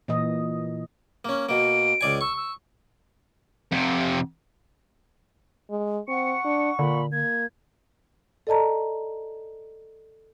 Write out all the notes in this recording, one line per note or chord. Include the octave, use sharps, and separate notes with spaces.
A#2 E3 D#5
A#3 C#4
B2 A#3 D7
C#2 D5 G#5
C#6 E6
E6
F2 C3
G#3
C4 F#5 C#6 C#7
D4
A#2 D3 B5
A#3 G#6
A4 D5 D#5 A5 A#5